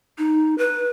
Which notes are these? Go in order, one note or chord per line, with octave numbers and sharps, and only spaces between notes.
D#4
B4